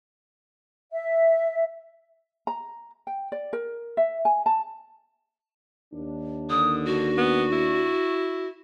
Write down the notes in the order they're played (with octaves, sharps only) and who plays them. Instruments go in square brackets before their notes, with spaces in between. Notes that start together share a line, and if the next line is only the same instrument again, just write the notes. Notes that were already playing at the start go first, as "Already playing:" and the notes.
[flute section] E5
[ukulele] A#5
G5
D5
A#4
E5
G#5
A5
[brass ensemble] D#2 D4
[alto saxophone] D3 [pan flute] D#6
[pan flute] F#4
[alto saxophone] B3
E4